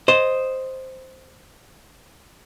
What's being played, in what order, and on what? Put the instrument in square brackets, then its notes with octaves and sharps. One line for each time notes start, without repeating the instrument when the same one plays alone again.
[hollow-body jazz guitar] C5 D#5